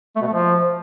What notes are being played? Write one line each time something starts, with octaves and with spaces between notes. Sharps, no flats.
A3
B2
A3
F3